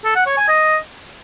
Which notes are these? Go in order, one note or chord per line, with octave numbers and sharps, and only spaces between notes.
A4
F#5
C#5
G#5
D#5